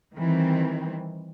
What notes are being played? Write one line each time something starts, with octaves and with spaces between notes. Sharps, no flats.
D#3 E3 G3 C4